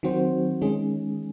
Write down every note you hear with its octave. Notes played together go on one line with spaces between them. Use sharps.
D#3 F#3 C4 F#4 C5
D#3 G#3 C#4 G#4